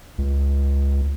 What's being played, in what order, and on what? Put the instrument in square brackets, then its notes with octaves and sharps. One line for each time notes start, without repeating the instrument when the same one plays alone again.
[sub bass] C#2